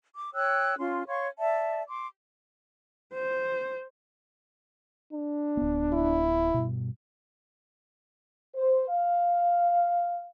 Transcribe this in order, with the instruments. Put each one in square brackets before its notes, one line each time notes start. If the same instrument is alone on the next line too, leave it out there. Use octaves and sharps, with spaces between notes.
[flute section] D6
C#5 G5 E6 F#6
C#4 F4 C6
C#5 F5 C6 C#6
D5 E5 A5
C6 D6
[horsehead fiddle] C5
[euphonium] D4
[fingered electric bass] D1 B3
[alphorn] E4
[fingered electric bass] G2 B2
[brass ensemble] C5
F5